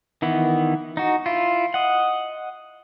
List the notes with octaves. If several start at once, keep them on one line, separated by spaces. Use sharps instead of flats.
D#3 E3 B3 E4
D#4 F#4
E4 F4
D#5 F#5